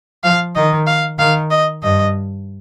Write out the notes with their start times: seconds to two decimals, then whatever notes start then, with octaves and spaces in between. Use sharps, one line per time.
0.24 F3 F5
0.55 D#3 D#5
0.87 F5
1.19 D#3 F5
1.50 D#5
1.83 G2 D#5